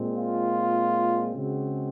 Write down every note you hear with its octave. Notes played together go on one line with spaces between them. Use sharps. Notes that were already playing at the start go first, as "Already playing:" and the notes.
Already playing: A#2 G#3 C4
F4
C#3 G#3 C4 F#4